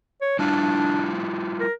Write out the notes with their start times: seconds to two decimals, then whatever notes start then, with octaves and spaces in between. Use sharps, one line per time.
0.21 C#5
0.39 G3 D4 E4 F4
1.60 A#4